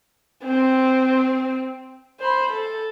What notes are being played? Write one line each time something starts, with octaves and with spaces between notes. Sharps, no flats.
C4
C5 B5
A4